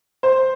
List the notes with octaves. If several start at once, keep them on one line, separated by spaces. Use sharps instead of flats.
C5